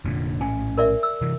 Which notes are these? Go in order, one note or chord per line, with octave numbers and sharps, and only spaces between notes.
F1 A#2 D3
A#1 A2 C#4 G#5
A#4 D5 E5
E6
C3 E3